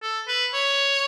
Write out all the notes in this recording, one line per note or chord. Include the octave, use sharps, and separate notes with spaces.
A4
B4
C#5